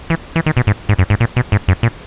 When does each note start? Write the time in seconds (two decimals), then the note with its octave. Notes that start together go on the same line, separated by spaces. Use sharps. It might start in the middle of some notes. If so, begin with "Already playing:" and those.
0.10 E3
0.36 E3
0.46 D#3
0.57 B2
0.67 G#2
0.89 G#2
0.99 F#2
1.10 G#2
1.20 A#2
1.36 B2
1.52 G#2
1.68 F#2
1.83 A#2